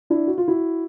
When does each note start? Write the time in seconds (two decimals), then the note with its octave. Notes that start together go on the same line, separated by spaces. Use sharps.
0.10 D4 E4
0.27 F#4
0.38 F4
0.48 E4 F#4